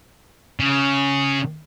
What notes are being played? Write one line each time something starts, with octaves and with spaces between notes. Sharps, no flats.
C#3